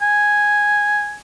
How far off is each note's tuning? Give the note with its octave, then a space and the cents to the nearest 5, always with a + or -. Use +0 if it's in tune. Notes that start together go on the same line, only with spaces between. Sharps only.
G#5 +0